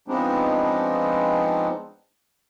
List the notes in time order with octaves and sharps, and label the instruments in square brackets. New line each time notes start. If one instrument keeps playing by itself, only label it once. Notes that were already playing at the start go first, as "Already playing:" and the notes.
[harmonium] F3 G#3 B3 C4 D4 D#4